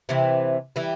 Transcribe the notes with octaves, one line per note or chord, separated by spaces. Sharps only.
C3 E3
E3 G3